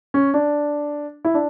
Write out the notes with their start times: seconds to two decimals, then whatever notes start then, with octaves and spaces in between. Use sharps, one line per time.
0.14 C#4
0.34 D4
1.25 E4
1.34 D4